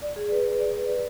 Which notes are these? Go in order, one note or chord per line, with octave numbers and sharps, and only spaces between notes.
D5
G#4
B4
B4
D5
D5
B4